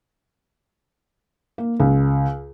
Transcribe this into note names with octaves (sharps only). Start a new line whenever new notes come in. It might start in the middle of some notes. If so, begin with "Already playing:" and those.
A#3
C#2